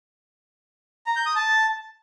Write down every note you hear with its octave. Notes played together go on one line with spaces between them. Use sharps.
A#5
G6
D#6
A5